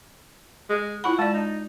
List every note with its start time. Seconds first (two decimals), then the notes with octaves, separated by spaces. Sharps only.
0.69 G#3
1.04 E4 F4 F#5 B5
1.19 G#3 D5 A5
1.34 D#4